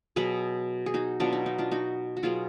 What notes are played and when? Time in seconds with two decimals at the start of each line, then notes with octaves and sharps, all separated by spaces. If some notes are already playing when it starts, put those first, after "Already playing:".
0.16 B2 F#3 B3 G#4 B4
0.86 G#4
0.94 D#4 F#4
1.20 B2 F#3 B3 D4 F4
1.33 D#4
1.46 D#4
1.58 D4 F4
1.71 D#4 F#4
2.17 F#4
2.23 B2 F#3 B3 F4 G#4